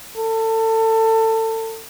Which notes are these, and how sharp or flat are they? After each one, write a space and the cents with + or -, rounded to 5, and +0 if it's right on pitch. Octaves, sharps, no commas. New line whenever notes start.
A4 +25